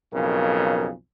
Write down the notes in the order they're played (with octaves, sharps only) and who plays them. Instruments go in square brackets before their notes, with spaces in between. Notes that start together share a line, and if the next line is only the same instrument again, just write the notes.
[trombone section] B1 F2 C#3 [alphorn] A#4